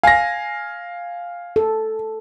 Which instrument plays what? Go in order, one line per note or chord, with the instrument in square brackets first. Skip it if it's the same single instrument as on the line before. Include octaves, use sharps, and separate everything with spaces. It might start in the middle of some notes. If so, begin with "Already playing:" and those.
[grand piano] F5 A#6 [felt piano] G#5
[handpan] A4